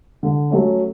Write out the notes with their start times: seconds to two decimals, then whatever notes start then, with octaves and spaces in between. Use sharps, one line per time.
0.23 D3
0.50 F#3 A3 C#4